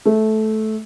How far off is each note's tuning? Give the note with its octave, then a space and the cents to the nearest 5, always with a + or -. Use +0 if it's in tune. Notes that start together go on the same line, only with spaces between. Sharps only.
A3 -15